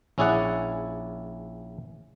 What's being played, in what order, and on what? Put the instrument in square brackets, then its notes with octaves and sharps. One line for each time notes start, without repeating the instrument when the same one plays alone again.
[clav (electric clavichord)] A#1 C#4 E4 G#4 D5 F#5